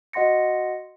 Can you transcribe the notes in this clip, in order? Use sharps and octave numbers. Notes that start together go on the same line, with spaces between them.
F#4 D#5 F#5 C6 A#6 C#7